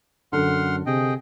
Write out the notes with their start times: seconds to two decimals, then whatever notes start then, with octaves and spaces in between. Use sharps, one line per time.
0.33 F#2 D3 F#5 C6 F6
0.86 C3 G#4 D#5 G5